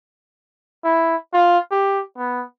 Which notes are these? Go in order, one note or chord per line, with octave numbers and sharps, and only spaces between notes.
E4
F4
G4
B3